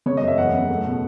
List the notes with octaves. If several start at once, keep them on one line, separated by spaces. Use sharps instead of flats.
C#3 C#5
D#5
F#2
E5
E2 F#5
C#3
A3
B2